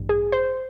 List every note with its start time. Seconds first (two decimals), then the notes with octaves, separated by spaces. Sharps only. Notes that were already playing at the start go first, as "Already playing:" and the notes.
Already playing: A1 G2
0.09 G#4
0.32 C5